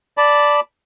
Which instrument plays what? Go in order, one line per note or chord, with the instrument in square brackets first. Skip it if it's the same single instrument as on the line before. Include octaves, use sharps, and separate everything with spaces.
[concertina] D5 A5 B5